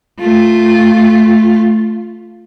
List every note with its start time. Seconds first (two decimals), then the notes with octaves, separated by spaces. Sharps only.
0.20 A3 F4